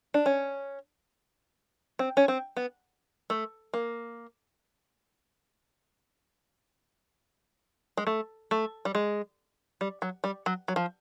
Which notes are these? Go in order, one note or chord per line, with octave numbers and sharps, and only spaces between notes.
D4
C#4
C4
C#4
C4
B3
A3
A#3
G#3
A3
A3
G3
G#3
G3
F#3
G3
F#3
F#3
F3